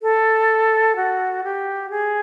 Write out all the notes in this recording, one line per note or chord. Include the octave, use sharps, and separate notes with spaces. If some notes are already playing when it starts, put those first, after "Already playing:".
A4
F#4
G4
G#4